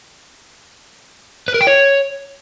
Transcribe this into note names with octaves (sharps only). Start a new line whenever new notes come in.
B4
A#4
G5
C#5